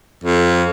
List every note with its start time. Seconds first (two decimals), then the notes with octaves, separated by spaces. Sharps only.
0.24 F2